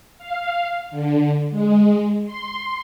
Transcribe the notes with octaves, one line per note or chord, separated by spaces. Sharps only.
F5
D3
G#3
C6